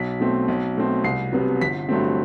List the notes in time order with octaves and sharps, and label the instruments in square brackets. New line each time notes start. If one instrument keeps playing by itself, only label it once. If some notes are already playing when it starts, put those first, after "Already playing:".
Already playing: [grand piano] B1 B6
B2 A3 C4
B1
B2 A3 C4
C2 C7
C3 F#3 B3
G1 B6
G2 F#3 A3 C4